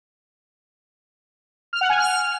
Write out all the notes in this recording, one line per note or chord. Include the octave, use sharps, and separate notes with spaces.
F6
F#5
G#5
F6